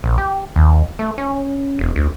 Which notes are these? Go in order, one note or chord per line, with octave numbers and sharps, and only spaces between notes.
A#1
G4
D#2
A3
C#4
E1
D2